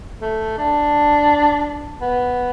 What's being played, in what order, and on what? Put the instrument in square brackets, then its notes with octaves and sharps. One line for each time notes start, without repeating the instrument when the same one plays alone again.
[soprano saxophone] A3
D4
B3